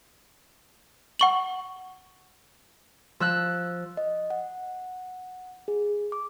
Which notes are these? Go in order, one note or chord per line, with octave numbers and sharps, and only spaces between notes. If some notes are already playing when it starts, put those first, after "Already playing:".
F#5 C#6 F#7
F3 E6 F#6
D#5
F#5
G#4
D6